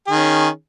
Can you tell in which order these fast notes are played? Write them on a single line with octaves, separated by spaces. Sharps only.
G#4 D#3 C#4